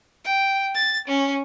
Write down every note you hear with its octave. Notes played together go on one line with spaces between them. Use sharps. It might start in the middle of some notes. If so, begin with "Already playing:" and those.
G5
A6
C#4